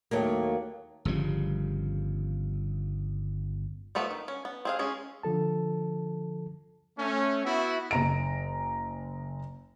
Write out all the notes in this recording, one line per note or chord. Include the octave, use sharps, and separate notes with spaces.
D#2 F#3 A3 A#3
G1 C#3 F3 G3
F3 A3 B3 B4
D#3
C#4
B3
C4 G#4 F5
G#3 C#4 G#4
D3 F3 A4 A5
A3 C#4
B3 E4 F#4 E5
F#1 A#5 D7